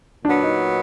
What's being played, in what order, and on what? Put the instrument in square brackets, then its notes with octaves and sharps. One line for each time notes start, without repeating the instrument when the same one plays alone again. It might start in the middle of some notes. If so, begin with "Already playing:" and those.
[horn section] A#2 F#3 B3 [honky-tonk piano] D4
[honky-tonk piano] D#4